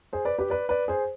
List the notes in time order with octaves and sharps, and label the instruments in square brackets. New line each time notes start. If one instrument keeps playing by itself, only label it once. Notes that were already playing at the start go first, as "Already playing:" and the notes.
[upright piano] G#4 C5
B4 D5
G4 B4
B4 D5
B4 D5
G#4 C5